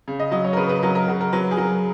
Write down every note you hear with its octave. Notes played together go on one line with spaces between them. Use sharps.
C#3
D#5
F#3 D#5
C#5
A#4
C#3 B4
B4
F#3 A#4
A#4
C#3 F#4
A#4
F#3 B4
G#4
F#3 A#4